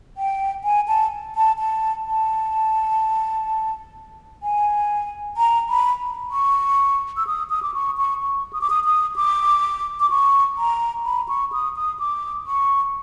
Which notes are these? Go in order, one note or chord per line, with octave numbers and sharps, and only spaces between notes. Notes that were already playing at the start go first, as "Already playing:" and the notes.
G5
G#5
A5
A5
A5
A5
G#5
A#5
B5
C#6
E6
D#6
D#6
D6
C#6
C#6
C#6
D#6
D6
D#6
D#6
D6
D6
C#6
A#5
B5
C#6
D#6
D#6
D6
C#6